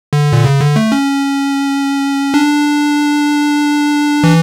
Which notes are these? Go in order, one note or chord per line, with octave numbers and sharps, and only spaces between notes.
D3
A#2
C#3
D3
A3
C#4
D4
E3